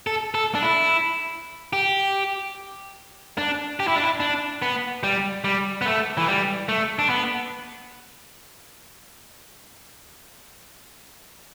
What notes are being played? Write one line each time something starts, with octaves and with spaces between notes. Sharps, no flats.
A4
A4
D4
E4
G4
D4
G4
E4
D4
E4
D4
B3
G3
G3
B3
A3
E3
G3
A3
D4
B3